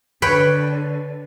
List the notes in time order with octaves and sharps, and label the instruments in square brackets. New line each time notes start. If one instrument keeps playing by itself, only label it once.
[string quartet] D3 [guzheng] B4 C#5 G5